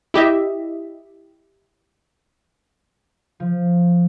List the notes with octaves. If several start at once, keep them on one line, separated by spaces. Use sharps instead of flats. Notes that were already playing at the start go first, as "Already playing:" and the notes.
E4 G4 D#5 E5
F3